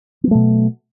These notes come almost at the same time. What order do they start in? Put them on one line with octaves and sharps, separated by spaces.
B3 F#3 A3 B2